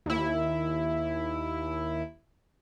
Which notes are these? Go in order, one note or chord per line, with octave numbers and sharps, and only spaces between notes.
D#2 E4